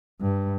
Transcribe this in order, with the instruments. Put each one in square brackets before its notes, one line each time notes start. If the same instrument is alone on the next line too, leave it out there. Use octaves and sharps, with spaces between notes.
[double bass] G2